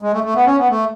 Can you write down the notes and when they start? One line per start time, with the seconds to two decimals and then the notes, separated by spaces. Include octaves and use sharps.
0.02 G#3
0.13 A3
0.24 A3
0.35 B3
0.46 C#4
0.58 B3
0.69 A3